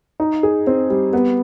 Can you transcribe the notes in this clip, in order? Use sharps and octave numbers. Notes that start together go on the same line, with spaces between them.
D#4
G#4
C4
G3
B3